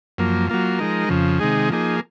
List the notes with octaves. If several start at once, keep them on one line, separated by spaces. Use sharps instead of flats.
F#2 F3 A#3
F#3 A#3 F4
F3 G#3 D#4 A#4
F2 C#3 F3
C3 D#3 G#3 D#4 G#4
F3 A#3 D#4 G#4